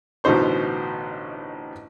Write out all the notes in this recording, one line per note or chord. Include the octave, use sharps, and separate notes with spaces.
A1 B2 D3 D#4 C5 C#6